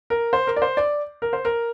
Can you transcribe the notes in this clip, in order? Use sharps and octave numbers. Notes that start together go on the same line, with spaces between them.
A#4
C5
A#4
D5
C5
D5
A#4
C5
A#4